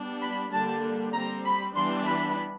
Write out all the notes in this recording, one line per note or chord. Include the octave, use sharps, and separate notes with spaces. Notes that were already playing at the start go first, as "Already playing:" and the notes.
Already playing: G3 B3 D4
B5
D3 G3 A#3 D4 A5
G3 C4 A#5
B5
E3 G3 B3 D4 C6
B5